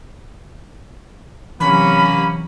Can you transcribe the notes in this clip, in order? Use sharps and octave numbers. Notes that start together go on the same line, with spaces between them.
C3 E3 F#3 A#3 C#4 B5